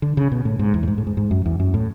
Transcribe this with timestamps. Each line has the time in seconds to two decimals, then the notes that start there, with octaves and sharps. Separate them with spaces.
0.02 D3
0.17 C#3
0.32 B2
0.45 A2
0.59 G#2
0.74 E2
0.83 A2
0.88 G#2
0.98 A2
1.07 G#2
1.17 G#2
1.31 F#2
1.46 E2
1.60 F#2
1.74 A2